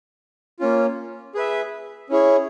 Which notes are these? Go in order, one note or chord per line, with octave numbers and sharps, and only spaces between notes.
A#3 C#4 F4
G#4 B4 E5
C#4 E4 G#4 C#5